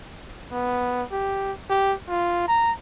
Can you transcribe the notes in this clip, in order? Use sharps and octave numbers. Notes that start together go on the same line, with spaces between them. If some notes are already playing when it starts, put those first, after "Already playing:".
B3
G4
G4
F4
A#5